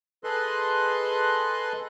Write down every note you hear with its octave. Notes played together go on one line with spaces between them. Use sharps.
G#4 A4 B4 D#5 C6 F#6